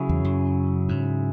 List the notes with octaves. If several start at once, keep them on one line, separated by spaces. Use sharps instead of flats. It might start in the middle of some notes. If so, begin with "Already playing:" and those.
Already playing: C#3 F#3 E4 G#4 C#5
E2
F#2
G#2